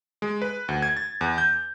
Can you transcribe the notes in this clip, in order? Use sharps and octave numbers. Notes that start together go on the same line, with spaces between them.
G#3
B4
D2
G#6
A6
E2
G6